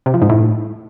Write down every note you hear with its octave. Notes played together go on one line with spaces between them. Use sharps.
C3
F3
G#2
A2